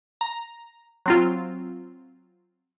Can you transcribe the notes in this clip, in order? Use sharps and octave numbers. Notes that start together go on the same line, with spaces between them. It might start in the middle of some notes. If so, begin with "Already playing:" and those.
A#5
F#3 C4 F4